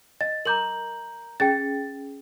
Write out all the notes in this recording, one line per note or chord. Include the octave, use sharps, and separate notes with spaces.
D#5 A6
A#4 A#5 C6 D6 G6 F#7
C#4 G#4 G5 A6